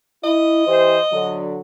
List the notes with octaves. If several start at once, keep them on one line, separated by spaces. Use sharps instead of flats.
E4 D#5
E3 G4 C5
D3 F#3